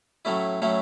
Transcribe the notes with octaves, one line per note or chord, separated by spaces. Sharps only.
A2 F#3 A3 C#4 E4
A2 F#3 A3 C#4 E4